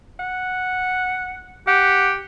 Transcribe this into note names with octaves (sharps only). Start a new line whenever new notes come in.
F#5
G4 F#5